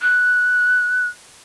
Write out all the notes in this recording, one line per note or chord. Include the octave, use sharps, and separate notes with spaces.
F#6